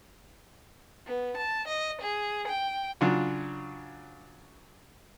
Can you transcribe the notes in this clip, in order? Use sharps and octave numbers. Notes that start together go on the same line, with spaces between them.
B3
A5
D#5
G#4
G5
C#3 F#3 D4 F4